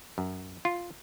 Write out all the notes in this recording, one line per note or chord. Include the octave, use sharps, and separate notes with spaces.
F#2
F4